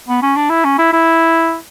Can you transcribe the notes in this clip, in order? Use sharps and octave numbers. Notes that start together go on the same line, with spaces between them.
B3
C#4
D4
E4
C#4
E4
E4